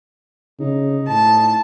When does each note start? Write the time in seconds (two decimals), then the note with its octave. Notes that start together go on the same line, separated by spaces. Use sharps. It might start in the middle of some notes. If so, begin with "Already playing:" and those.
0.59 C#3 D#4
1.08 A2 A5